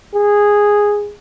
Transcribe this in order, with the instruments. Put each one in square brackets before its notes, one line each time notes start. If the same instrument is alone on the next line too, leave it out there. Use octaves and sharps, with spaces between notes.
[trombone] G#4